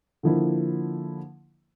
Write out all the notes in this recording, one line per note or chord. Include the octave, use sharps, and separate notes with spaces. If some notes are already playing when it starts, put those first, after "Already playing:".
D3 F3 A#3 E4